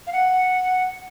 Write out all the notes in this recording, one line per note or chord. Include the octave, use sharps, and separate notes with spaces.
F5
F#5